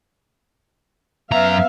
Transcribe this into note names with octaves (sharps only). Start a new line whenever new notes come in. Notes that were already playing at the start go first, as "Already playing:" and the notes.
F#2 B3 E5 F5 A#5